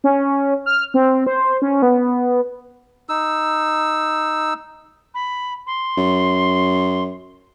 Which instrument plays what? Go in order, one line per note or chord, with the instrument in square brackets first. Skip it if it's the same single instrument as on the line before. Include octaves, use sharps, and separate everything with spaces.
[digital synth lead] C#4
F6
C4
C5
C#4
B3
[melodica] D#4 E6
[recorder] B5
C6
[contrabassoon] F#2